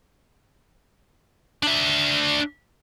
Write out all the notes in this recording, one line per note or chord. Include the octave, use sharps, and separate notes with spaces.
D4 E5